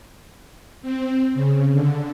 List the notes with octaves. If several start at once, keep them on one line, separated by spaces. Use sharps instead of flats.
C4
C#3
D3